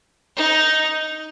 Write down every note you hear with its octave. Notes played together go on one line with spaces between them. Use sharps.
D#4